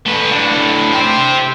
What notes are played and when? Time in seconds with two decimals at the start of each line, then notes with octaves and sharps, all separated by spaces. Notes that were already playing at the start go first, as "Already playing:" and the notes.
0.06 A3 B4
0.31 A2 D4
0.92 G4 C5